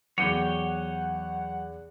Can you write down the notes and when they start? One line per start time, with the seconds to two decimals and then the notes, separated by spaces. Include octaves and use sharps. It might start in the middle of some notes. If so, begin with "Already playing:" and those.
0.18 E2 F#3 C#5 F#5 G5 D6 D#7